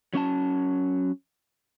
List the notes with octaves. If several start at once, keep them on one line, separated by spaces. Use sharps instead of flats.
F#3 C#4 F5 A5